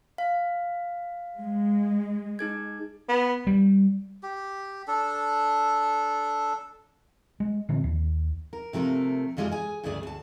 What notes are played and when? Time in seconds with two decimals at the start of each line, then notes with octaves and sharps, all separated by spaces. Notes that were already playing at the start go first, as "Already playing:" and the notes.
0.18 F5
1.36 G#3
2.39 D#4 G#4 G#6
3.09 B3
3.47 G3
4.23 G4
4.88 D4 A4
7.40 G#3
7.69 A#2 D3 F3 C4
7.84 D#2
8.53 A#4
8.73 C3 F3 A3 A#4
9.37 F2 E3 G3 G#3 D4 F4
9.51 G#4 G#5
9.83 D2 G2 C#3 A3 G#4 D5
10.03 D2 A5